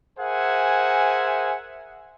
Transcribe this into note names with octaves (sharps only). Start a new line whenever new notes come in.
G#4 A#4 C5 E5 F#5 G#5